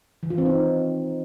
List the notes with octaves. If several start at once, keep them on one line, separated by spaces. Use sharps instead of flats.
E3
F4
C4
D#4